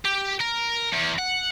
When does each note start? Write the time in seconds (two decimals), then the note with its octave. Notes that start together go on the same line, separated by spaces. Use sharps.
0.05 G4
0.40 A#4
0.92 E2
1.18 F#5